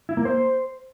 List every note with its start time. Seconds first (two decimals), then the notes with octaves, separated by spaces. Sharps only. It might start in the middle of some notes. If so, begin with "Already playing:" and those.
0.09 E4
0.17 A#3
0.25 C5